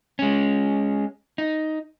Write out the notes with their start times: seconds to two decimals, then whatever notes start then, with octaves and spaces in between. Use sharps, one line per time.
0.19 G#3 C#4
1.38 D#4